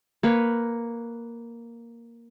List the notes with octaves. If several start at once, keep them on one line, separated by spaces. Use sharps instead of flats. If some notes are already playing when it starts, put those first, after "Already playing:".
A#3 B4 C#5